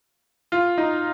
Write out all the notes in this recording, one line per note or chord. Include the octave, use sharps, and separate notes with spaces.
F4
D#4